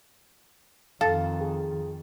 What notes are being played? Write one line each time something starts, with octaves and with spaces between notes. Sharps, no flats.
F2 D#3 A4 F5
G#4